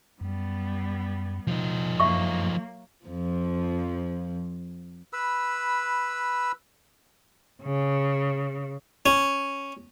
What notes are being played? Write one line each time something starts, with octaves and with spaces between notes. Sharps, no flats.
F#2 G3 B3
B2 F3 D#4
F#2 F#3 A#3 E5 C#6
F2 F3
B4 B5 E6
C#3
C#4